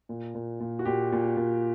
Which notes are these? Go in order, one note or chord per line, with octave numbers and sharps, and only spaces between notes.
A#2
A#2
A#2
F#4
A#2 G4
A#2
A#2